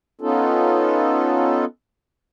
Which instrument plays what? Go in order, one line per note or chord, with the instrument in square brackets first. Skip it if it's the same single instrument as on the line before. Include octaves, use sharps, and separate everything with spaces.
[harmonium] B3 C#4 D#4 F4 A4